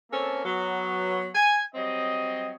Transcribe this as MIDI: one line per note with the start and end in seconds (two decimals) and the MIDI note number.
0.11 0.41 58
0.11 0.41 60
0.11 0.41 61
0.11 0.41 69
0.45 1.28 54
0.45 1.28 59
1.35 1.59 80
1.75 2.54 54
1.75 2.54 55
1.75 2.54 60
1.75 2.54 73
1.75 2.54 75